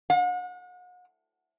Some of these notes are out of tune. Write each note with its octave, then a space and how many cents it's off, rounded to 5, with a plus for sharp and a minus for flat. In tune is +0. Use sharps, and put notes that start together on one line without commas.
F#5 -40